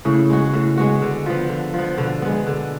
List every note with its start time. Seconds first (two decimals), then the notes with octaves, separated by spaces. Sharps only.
0.05 A2 C#3
0.29 G#3 B3 F#4
0.53 A2
0.77 G#3 B3 F#4
1.02 D3
1.26 F3 B3
1.49 D3
1.74 F3 B3
1.98 B2 D3
2.22 G#3 B3
2.47 D3